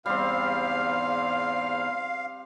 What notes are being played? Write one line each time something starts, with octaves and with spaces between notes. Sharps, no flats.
E2 G#2 G3 C4 F5 F6